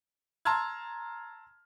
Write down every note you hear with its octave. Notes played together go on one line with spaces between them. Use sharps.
A5 A#5 C6 E6 F6 G#6